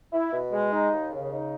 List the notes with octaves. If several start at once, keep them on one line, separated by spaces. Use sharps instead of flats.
E4
B2
G#3
D#4
D#2
C#3
D#4